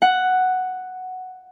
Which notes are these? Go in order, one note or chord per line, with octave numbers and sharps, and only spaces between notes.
F#5